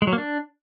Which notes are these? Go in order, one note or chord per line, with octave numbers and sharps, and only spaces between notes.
G#3
F#3
A#3
D4